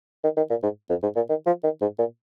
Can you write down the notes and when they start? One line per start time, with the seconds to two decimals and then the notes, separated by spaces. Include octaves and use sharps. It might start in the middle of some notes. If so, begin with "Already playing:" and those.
0.24 D#3
0.37 D#3
0.50 A#2
0.63 G#2
0.90 F2
1.03 G#2
1.16 A#2
1.29 D#3
1.46 F3
1.64 D#3
1.81 G#2
1.99 A#2